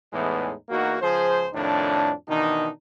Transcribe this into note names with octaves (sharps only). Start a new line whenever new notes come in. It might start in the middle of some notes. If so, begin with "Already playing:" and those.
E2 A2 E3 G#3 B3 D#4
E2 A#3 D#4 F#4
C#2 F3 G#4 C5
F2 A2 D#3 D4
B2 D#3 E3 D4 D#4